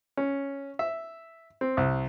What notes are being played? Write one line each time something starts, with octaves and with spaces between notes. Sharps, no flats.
C#4
E5
C4
C2